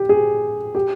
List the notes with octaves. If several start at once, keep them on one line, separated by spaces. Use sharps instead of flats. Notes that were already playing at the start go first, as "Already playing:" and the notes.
Already playing: G4
G#4
G4